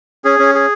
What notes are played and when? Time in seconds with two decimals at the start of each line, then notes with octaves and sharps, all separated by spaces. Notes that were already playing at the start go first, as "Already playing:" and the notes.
0.25 C#4 G#4
0.39 C#4
0.55 G#4